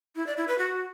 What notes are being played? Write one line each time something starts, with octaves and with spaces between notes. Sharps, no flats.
E4
D5
E4
B4
F#4